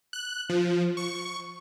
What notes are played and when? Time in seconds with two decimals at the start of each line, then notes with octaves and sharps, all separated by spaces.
0.13 F#6
0.49 F3
0.97 C#6